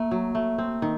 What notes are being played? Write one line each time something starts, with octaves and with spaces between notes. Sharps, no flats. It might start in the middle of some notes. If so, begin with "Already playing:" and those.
Already playing: A3 A#3
F#3
A3
C4
D#3